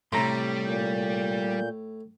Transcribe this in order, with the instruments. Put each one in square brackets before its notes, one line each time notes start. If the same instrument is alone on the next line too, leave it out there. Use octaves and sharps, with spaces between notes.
[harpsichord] A2 [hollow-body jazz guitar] C3 A#5 C6 [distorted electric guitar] G3
[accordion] A#2 G6